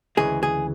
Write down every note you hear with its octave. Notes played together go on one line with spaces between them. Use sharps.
D2 C#3 E3 G#3 G#4
G#4